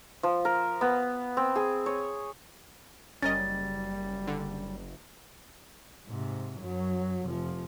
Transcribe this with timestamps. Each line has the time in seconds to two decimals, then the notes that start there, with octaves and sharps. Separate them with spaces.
0.23 F3
0.45 A#4
0.81 B3
1.37 C4
1.56 G#4
1.86 C#5
3.22 F#1 G3 C#4 A#4 D#5 A6
4.27 D3
6.07 G#2 C3
6.58 F#2 F#3
7.25 F1 F3